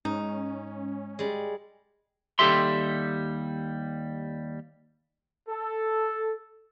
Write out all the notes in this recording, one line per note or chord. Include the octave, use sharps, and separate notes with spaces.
G#2 C#4 D#4
G3 G#3
D#2 G3 G4 A4 E5 C6
A4